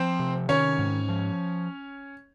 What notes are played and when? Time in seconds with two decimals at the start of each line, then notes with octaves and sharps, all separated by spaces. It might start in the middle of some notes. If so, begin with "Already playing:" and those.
Already playing: F3 C4 C5
0.20 C3
0.49 D#3 C#4 C#5
0.79 G#2
1.09 F3